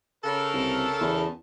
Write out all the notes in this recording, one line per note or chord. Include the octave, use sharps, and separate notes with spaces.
C#3 A4 A#4
C2
E2